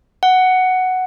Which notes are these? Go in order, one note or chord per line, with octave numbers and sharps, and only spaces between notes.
F#5